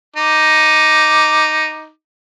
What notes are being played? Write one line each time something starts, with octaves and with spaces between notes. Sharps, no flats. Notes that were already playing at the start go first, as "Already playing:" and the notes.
D#4 D6